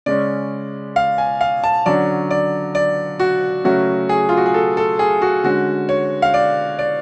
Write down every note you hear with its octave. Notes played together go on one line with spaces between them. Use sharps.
C#3 G#3 C#4 D5
F5
G#5
F5
A5
D3 F#3 C#4 D5
D5
D5
F#4
C#3 F#3 A3 C#4 F#4
G#4
F4
F#4
G#4
A4
A4
G#4
F#4
D3 G#3 C#4 F#4
C#5
F5
D5
D5